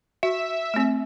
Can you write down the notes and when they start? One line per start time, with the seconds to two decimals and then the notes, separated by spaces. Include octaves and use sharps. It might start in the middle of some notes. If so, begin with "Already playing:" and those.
0.23 F#4 E5
0.74 A3 C4